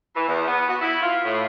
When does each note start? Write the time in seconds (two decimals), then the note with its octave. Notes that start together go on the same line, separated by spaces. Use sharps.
0.15 E3
0.27 E2
0.47 B3
0.68 F#4
0.81 E4
1.01 F4
1.25 A2